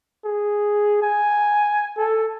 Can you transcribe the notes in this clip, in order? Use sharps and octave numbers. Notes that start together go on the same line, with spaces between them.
G#4
G#5
A4